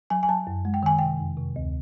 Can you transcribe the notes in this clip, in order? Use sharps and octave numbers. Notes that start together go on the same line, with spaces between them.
F#3 G#5
G#5
F#3 A5
F#2
G#3
G5
D#3 G#5
C3 G5
F2
C3
D2